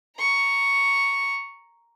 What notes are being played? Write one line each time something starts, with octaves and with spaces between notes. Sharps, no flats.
A#5 C#6